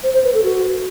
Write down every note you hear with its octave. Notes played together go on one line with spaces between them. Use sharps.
C5
C5
B4
A4
F#4